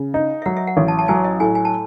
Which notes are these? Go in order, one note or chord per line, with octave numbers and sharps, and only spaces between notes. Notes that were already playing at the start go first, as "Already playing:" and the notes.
Already playing: C#3
D#4
E5
F#3 F#5
E5
F#5
A1
A5
A5
F#3 G#5
D#5
A2 G#5
G#5
A5